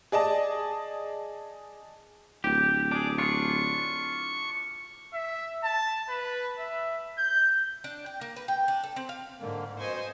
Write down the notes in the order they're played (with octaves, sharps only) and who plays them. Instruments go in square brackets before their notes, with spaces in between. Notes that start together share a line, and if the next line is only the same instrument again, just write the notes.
[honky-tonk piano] G#4 D5 D#5 A5
[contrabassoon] D1 [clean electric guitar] G4
[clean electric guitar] D4 G#4 [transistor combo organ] D6
[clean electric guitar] D4 F4 [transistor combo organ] C#6
[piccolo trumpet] E5
A5
B4
E5
G6
[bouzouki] D4
G5
A#3
B4
G5
D4
A4
C4
F5
[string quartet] G#2 [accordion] D3 A#3
[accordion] F2 B2 C#6 [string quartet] C5 D#5 G#5